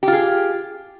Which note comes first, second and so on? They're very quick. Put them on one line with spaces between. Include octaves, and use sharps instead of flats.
G4 F4 G#4